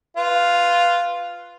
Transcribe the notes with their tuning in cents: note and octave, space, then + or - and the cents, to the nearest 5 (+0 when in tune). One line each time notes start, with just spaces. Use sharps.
F4 +0 B4 +0